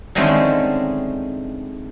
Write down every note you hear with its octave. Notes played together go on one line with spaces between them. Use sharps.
D3 D#3 G#3 A3 C4 C#4